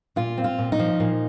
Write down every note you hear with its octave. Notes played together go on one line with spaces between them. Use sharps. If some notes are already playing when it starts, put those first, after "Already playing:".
A#2 F4
C4
F4
A#2
D#4
F3
A#2